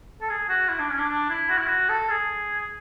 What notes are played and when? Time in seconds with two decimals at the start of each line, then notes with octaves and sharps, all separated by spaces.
0.21 A4
0.29 G#4
0.49 F#4
0.69 E4
0.79 D4
0.90 C#4
0.99 D4
1.09 D4
1.29 E4
1.49 F#4
1.58 E4
1.67 F#4
1.89 A4
2.09 G#4